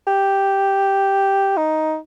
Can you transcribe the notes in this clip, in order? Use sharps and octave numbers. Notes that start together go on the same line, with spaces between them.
G4
D#4